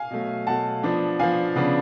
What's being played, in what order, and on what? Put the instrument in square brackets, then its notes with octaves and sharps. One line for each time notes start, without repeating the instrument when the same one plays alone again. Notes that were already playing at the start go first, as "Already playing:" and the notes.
Already playing: [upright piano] F5 G#5
B2 F#3 A3
B2 F#3 A3 F#5 A5
F3 B3 D4
F3 B3 D4 F5 G#5
C#3 F3 B3 D4